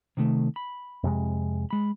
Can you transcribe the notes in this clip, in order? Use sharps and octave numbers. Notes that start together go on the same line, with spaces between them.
C3 D#3 A3
B5
F2 C3 G#3
G#3 B5